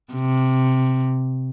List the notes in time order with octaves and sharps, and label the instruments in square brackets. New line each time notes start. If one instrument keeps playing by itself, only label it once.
[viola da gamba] C3